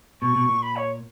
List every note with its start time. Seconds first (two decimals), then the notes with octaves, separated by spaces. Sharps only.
0.21 B2 C#6
0.35 B2
0.49 A#2
0.63 B5
0.76 C#5